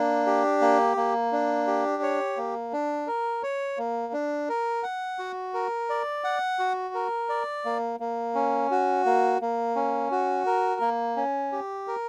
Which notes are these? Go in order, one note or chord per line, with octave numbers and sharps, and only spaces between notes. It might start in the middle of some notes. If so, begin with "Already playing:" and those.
Already playing: A#3 D4
G4
A#3
A#3
D4
G4
C#5
A#3
D4
A#4
C#5
A#3
D4
A#4
F#5
F#4
A#4
D5
F#5
F#4
A#4
D5
A#3
A#3
C#4
F#4
A#3
A#3
C#4
F#4
A#4
A#3
C#4
G4
A#4